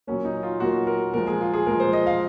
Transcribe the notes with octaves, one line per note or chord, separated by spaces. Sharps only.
A#2 F#3 A#3 C#4
D#4
F4
A#2 F#3 A#3 F#4
A#4
A#2 F3 G#3 A#4
G#4
F4
G#4
A#2 F3 G#3 A#4
C5
D#5
F5